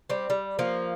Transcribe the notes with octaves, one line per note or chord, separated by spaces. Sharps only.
G3 C4
G3
F3 A#3